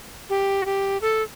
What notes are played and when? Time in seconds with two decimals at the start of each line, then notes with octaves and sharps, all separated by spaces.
0.30 G4
0.62 F#4
0.65 G4
1.01 A4